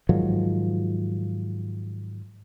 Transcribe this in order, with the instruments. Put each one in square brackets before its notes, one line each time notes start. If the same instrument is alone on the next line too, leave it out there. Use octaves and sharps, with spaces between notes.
[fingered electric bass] G#2 D#3 F3 F#3